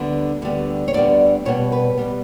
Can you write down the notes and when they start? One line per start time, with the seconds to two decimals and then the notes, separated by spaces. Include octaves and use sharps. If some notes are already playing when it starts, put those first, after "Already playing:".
Already playing: D2 D3 G3 B3
0.42 D2 D3 G3 B3
0.88 C#5
0.94 D2 D3 G3 B3 D5
1.45 B2 G3 B3 C#5
1.72 B4
1.97 B2 G3 B3